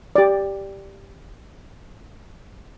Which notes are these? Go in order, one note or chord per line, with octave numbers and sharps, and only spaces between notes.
G4 D5